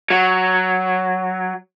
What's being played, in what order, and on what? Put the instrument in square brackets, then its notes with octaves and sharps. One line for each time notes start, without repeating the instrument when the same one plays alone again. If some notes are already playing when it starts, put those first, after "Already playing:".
[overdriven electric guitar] F#3